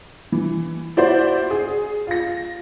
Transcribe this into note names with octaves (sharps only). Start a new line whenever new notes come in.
E3
E4 F#4 C5 D5
G#4
F4 A#6